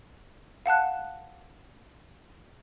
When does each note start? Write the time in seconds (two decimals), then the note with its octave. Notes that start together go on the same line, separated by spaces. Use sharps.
0.66 F5 F#5 A5 F#6